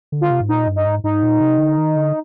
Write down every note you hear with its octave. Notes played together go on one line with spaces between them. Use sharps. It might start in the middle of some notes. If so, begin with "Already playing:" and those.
D3
F4
C3
G#2
A#2 D#4
G2
D#4
G#2
G#2 D#4
A#2
C3
D3
D#3
D3